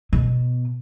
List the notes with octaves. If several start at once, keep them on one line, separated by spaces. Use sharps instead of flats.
B2